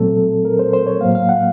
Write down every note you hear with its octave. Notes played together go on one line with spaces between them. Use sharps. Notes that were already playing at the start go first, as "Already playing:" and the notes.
Already playing: A#2 F#3 A3 C4 A4
A#4
C5
C5
C#5
A2 F#3 A#3 F5
F5
F#5